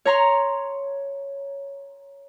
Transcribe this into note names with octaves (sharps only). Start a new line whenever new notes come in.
C#5 A#5 C6